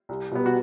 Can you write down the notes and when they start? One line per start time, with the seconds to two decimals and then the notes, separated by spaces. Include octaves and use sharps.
0.09 C2
0.31 B2 G3 B3
0.46 F#4